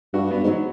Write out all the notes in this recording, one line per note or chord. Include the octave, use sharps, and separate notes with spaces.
G2 F#4
G2 B3
G#2
F#3